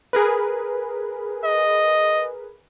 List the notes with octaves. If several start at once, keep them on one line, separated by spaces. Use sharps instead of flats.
G#4 A#4 B4
D#5